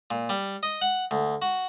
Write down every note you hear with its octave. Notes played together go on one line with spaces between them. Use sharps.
A#2
G3
D#5
F#5
D2
F#4